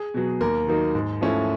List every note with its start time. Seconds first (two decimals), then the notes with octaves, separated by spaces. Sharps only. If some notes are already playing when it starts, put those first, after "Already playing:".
Already playing: G#4
0.14 B2 F#3
0.40 D#2 A#4
0.67 D#3 F#3 A#3 D#4
0.95 G#2
1.21 F3 A3 C#4 E4